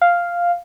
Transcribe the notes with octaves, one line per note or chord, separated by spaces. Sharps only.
F5